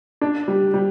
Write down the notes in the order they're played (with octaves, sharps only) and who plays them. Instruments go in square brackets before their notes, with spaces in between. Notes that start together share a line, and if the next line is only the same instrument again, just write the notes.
[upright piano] D4
G3
G3